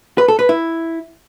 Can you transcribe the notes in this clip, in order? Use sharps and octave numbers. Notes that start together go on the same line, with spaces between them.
B4
A4
B4
E4